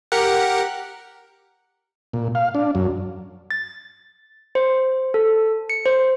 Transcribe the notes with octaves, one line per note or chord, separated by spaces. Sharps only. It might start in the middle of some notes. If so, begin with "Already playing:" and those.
G4 A#4 F#5
A#2
F5
D4
F#2
A6
C5
A4
C#7
C5